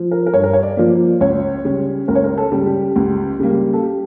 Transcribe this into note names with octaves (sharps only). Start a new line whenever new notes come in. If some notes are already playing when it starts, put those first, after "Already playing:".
Already playing: F3
A#4
A#4
G2 C#5
A#4
C#5
D5
F3 A#3
C#2 C#5
C#3 G3
C#2 A#4
C#5
A#4
A4
C#3 G3
G4
C#2
C#3 G3 A#3
A4
G4